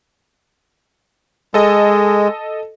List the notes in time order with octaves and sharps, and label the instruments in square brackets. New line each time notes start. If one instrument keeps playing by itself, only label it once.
[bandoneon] G#3 [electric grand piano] A4 D#5